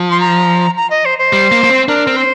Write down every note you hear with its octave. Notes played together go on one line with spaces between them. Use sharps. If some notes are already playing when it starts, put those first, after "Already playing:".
Already playing: F3
C6
A#5
A#5
D#5
C5
C5
G3
A#3
A#3
C4
D4 A#4
C4
C5